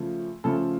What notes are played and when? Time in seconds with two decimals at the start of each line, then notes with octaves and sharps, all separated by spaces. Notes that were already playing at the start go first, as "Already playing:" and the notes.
Already playing: C#3 F3 A3
0.44 C#3 F3 A3 A4